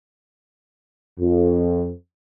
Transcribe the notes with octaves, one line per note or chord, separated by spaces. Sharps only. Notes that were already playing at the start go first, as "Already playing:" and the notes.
F2